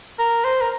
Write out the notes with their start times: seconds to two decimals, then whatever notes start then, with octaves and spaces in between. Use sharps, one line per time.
0.19 A#4
0.44 C5
0.61 A#4